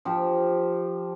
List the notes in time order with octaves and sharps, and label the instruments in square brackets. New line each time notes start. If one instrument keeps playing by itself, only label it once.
[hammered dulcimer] F3 G4